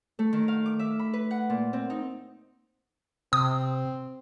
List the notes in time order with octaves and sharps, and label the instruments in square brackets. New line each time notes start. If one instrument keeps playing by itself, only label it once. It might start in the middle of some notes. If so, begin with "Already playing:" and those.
[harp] A3
D#3
F5
D6
E5
B5
B4
F#5
A#2
C4
D#4
[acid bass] C3 [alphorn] C4 [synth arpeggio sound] D#6